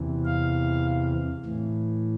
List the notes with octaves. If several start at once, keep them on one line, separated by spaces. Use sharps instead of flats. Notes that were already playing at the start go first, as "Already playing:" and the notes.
Already playing: E2 C3 E3
F5
A2 E3